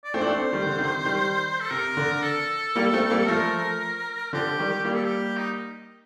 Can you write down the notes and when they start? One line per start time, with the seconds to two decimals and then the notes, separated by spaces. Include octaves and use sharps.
0.04 D5
0.14 A3 C4 C5
0.21 D4
0.27 A3 C4
0.53 D#3 G3
0.66 D3
0.79 C3 D#3
1.05 D#3 G3
1.61 A4
1.71 C3 A#4
1.97 D3
2.23 A4
2.76 G3 A#3
2.93 A3 C4
3.10 G3 A#3
3.28 F3 A3 A#4
4.33 D3 F3 G4
4.59 D#3 G3
4.84 G3 A#3 G4
4.94 A4
5.04 G4
5.37 D#4